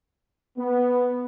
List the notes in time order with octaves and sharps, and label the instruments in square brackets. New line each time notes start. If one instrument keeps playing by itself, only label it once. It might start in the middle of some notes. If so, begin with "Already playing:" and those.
[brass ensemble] B3